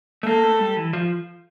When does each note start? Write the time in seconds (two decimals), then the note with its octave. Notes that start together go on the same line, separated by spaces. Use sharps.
0.23 A3
0.26 A#3 A4
0.43 A3
0.59 G3
0.76 E3
0.93 F3